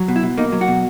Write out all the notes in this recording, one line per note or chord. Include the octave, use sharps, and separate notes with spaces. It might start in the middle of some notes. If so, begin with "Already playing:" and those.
Already playing: F#3
B2
E4
B2
A#3 D#4
F#3
F#4
B2